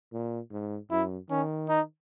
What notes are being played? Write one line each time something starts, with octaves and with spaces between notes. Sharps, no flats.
A#2
G#2
F#2 E4
D#3 C#4
D#4